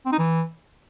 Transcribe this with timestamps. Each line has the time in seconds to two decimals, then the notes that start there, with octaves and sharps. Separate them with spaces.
0.06 C4
0.12 D#4
0.19 E3